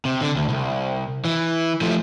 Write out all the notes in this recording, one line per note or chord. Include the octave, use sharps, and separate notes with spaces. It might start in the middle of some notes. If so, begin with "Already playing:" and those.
C3
D3
D2
C2
E3
F3 A3